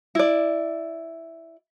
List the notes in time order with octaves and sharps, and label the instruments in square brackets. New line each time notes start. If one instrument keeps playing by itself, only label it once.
[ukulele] E4 D5